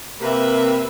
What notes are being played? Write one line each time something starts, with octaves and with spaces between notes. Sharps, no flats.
C3 A#3 B4 E5